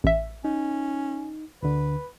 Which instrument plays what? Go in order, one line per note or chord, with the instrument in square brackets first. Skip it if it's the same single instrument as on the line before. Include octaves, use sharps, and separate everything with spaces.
[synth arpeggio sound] A1 E5
[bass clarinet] C#4 [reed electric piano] D#4
[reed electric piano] D2 D3 [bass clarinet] B4